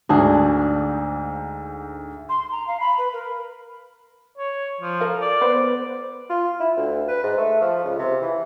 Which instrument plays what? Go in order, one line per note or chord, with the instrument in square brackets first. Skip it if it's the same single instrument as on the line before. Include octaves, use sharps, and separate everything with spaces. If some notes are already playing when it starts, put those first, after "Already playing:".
[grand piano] D2 G#2 [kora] D4 F#4 G#4
[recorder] C6
A#5
F5
B5
B4
A#4
[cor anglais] C#5
F3
[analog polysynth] A4 A#4 F5
[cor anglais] D5
[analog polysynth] B3 B4 C5
[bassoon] F4
E4
D2
B4
G#2
A3
F3
C#2
C3
E3